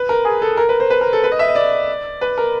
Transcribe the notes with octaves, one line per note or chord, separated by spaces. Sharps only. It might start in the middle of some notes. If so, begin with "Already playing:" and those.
Already playing: B4
A#4
G#4
A4
A#4
B4
C5
B4
A#4
A4
B4
D#5
E5
D#5
D5
B4
A#4